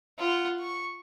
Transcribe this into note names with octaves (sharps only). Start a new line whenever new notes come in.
F4 F#5
C#6